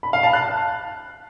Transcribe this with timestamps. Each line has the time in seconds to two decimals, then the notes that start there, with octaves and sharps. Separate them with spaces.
0.03 B5
0.13 F5
0.23 A5
0.33 F#6